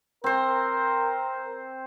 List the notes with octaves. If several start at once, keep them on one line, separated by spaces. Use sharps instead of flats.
C4 A#4 C5